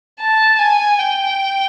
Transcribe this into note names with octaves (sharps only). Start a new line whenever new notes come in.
A5
G#5
G5